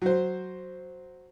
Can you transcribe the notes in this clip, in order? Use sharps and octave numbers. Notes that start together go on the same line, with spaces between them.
F#3 C5